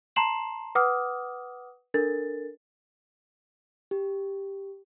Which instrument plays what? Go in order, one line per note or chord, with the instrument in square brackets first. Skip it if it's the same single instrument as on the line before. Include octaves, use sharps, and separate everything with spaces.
[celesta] A5 A#5 C6 C7 E7 F#7
B4 F#5 D6 D#6 F6
D4 A4 A#4 A6
[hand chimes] G4